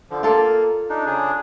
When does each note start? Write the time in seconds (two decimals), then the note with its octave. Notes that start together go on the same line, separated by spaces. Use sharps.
0.10 D3 F3
0.23 A#3 F4 A4 D5
0.90 D4 D#4
1.06 C#3 D4 G#4